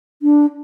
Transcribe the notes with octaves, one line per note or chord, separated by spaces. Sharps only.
D4